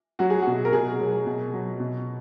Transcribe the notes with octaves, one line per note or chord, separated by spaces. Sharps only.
F#3 F#4
G#4
B2 F#4
A#4
B2 G#4
F#3
B2
F#3
B2